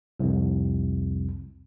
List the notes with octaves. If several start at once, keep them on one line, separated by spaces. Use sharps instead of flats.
C2 F2